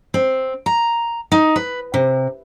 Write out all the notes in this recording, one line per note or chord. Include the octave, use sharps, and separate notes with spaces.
C4
A#5
D#4
B4
C3